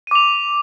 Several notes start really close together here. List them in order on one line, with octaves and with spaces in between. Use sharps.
D#7 D6 F7